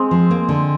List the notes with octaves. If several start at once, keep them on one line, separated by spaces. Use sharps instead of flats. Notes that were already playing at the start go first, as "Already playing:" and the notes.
Already playing: G#3 C4
F3
A#3
D3